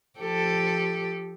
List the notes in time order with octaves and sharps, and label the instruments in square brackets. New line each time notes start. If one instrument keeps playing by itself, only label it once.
[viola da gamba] F3 G4 A4